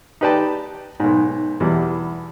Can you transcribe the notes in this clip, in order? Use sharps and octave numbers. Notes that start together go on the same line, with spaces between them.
D#4 G4 B4 D5 G5 A5
B1 G#2
E2 B2 E3 G3